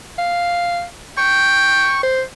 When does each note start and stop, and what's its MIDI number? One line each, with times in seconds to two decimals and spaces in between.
0.19 0.84 77
1.18 2.04 79
1.18 1.99 85
2.03 2.22 72